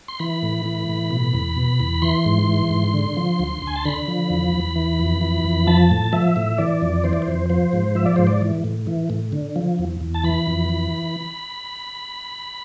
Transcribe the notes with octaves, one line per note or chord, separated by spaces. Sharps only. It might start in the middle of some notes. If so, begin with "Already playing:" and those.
C6
E3 B5
A2
E3
A2
B2
E2
B2
E2
E3 C6
G#2
E3
G#2
D3
F3
D2
D2
G#5
A5
D3 B5
F3
E2
E2
E3
F2
E3
F2
F3 A5
A2
F3 E5
A2
E3 D5
F2
E3 C5
D5
C5
F2
F3 C5
G#2
F3 E5
D5
G#2 C5
D5
E3
A2
E3
A2
D3
F3
E2
E2
A5
E3 B5
F2
E3